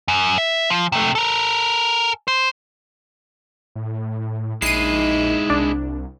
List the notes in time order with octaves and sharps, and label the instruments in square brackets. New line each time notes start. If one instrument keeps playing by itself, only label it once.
[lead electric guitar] F#2
E5
F3
C3 A3
A4 A#4
C5
[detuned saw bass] A2
[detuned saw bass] A#1 [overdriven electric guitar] G#3 E4 [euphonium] D#4 [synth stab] C7 D#7
[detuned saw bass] C2 [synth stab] D4